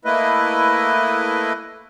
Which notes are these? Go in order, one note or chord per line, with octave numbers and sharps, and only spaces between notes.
A3 A#3 E4 B4 D#5